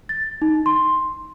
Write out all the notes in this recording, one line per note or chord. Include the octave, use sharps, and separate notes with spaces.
A6
D#4
C6